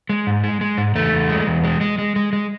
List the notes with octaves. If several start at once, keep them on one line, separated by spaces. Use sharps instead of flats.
G#3
G#2
G#3
G#3
G#2
E2 A3
E2
G#3
E2
G#3
G#3
G#3
G#3
G#3